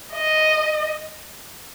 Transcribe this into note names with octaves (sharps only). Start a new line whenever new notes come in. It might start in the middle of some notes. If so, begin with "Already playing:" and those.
D#5